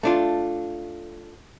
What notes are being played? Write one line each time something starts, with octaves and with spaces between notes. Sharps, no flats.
A3 D4 F4